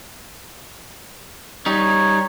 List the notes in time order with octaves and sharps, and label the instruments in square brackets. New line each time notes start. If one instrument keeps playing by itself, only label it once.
[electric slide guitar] G3 D#4 [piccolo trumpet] C#5